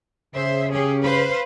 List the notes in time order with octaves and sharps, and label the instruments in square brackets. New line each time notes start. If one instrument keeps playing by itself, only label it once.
[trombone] C#3 [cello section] G#4 C5 E5
[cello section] C#4 G4 G#4
B4 C5 F5